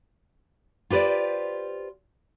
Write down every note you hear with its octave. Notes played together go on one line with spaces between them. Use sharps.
F4 G4 B4 C5 D5